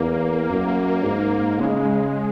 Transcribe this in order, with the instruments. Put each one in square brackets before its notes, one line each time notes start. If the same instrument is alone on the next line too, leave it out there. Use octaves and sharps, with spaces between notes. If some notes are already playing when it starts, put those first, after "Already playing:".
Already playing: [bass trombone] E2 [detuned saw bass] A#3
[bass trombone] F#2
G#2
[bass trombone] C#3 [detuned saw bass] G#3